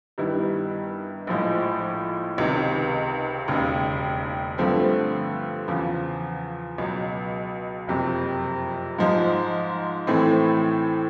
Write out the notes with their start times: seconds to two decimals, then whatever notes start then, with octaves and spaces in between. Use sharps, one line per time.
0.18 G2 D#3 G3 B3 E4
1.27 A#1 A2 F3 G#3
2.38 C#2 C3 D#3
3.48 E1 D#2 C#3
4.58 G2 D3 F3 A3 C4
5.68 E2 C#3 F3
6.78 C#2 B2 F#3
7.87 F#1 F2 C3
8.98 G#2 F3 G#3
10.07 A2 E3 A3 C4